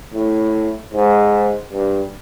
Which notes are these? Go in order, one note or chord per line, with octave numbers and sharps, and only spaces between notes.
A2
G#2
G2